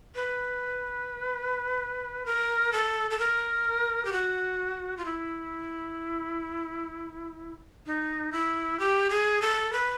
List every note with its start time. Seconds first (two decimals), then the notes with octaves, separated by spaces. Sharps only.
0.15 B4
2.26 A#4
2.73 A4
3.11 A4
3.19 A#4
4.05 G4
4.13 F#4
4.97 F4
5.05 E4
7.86 D#4
8.32 E4
8.79 G4
9.10 G#4
9.42 A4
9.73 B4